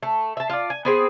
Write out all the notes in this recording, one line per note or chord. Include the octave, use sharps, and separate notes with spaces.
A3
E5 A5
F4 D5
G#5
B3 C4 G#4